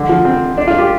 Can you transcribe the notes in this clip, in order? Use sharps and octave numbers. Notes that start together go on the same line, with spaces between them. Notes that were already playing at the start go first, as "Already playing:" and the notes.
Already playing: D3
F3
C4
D4
F4
G4